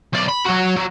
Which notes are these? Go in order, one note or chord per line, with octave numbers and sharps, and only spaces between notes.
B1 D5
B5
F#3 F#4
F#3